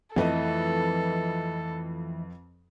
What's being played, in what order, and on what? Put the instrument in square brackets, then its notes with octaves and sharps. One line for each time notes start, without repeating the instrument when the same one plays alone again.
[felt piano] F2 B4 D#5 [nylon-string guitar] E3 A3 [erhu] A4